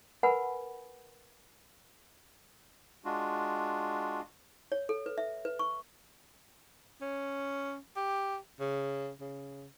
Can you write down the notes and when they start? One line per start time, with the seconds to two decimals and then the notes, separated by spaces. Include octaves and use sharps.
0.23 A#4 B4 F#5 G#5 B5
3.05 G#3 D4 F4 F#4
4.72 C#5
4.89 A4
5.06 B4
5.18 E5
5.45 B4
5.59 C#6
7.01 C#4
7.97 G4
8.60 C#3
9.21 C#3